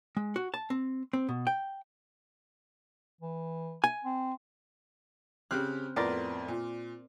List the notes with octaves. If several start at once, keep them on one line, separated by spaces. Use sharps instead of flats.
G#3
F#4
A5
C4
C4
B2
G5
E3
G#5
C4
C#3 C4 G4 F6 F#6
F2 A2 B3 A#4 D5 C6
A#2